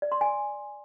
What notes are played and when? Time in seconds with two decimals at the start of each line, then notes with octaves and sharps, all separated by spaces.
0.02 D5
0.12 C6
0.21 G#5